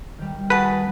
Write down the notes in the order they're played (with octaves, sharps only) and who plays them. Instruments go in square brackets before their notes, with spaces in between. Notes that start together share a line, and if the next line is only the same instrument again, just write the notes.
[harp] D#3 G3
[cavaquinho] F#4 G#4 A5 [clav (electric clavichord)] B4